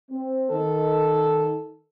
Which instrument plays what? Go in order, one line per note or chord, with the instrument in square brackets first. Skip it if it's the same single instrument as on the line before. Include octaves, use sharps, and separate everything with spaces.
[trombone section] C4
[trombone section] D#3 [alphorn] A4